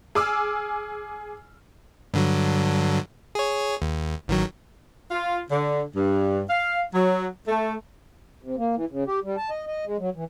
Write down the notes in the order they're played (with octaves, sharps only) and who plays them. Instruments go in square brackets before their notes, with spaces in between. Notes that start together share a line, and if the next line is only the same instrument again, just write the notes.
[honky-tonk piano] G#4 G#5 D6 E6 F6
[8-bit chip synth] G2 D3 F#3
G#4 C#5
D#2
A1 D#3 F#3
[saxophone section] F4
D3
G2
F5
F#3
A3
[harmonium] C3
A#3
E3
C#3
G4
G3
A5
D#5
D#5
G#3
F#3
E3